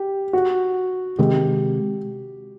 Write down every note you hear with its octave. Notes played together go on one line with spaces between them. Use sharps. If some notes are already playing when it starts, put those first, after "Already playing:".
Already playing: G4
F#4
C3 D#3 G#3 C4 G4